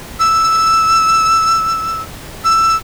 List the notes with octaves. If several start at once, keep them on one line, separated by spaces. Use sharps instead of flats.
E6
E6